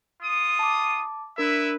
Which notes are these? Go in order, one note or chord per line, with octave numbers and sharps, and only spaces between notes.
F4 D#6
A5 D6
D4 E4 A#4 B4 E5